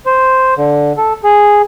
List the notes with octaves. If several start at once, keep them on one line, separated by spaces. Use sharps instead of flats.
C5
D3
A4
G#4